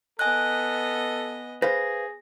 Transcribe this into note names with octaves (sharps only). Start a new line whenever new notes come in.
B3 A4 D#5 G#5 F#6
G#4 B4 C5 F5 A#6